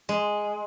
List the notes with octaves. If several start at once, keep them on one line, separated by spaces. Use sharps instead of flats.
G#3